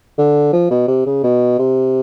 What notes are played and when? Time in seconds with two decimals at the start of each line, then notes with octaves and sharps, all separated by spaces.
0.18 D3
0.53 F3
0.71 B2
0.88 C3
1.06 C#3
1.23 B2
1.59 C3